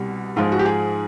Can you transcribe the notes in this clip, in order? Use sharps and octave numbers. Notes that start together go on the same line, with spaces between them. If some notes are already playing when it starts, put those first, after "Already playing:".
Already playing: C2 B2 G3
G#2 F3 G#3 F4
F#4
G4
G#4